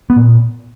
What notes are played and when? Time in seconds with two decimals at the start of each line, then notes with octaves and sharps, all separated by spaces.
0.10 B3
0.16 A#2